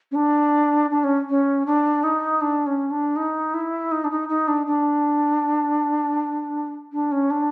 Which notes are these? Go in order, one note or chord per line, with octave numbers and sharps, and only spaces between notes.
C#4
D4
D4
C#4
C#4
D4
D#4
D4
C#4
D4
D#4
E4
D#4
D4
D#4
D#4
D4
D4
D4
C#4
D4